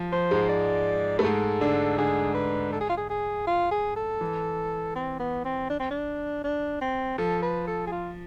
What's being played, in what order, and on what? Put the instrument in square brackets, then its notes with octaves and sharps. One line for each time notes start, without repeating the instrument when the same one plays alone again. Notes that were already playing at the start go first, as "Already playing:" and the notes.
Already playing: [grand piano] F3
[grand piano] F3 [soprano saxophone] C5
[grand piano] G#2 G#3
[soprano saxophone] D5
[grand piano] A3 [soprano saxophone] B4
[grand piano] G#2 G#3 [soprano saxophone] A4
[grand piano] D3 D4
[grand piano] D3 D4 [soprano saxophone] G#4
[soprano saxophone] B4
A4
G#4
F4
G#4
G#4
F4
G#4
A4
[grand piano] E3
[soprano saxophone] C4
B3
C4
D4
C4
D4
D4
C4
[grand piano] F3 [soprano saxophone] A4
[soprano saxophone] B4
A4
G#4
F4